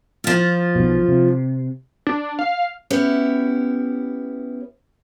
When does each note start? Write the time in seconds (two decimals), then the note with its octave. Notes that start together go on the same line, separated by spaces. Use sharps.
0.24 F3 F4
0.75 B1 B2
1.08 C3
2.07 D4
2.39 F5
2.91 B3 C#4 E4 G4